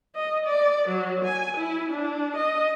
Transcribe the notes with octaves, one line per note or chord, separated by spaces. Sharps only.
D#5
D5
F#3
G#5
E4
D4
D#5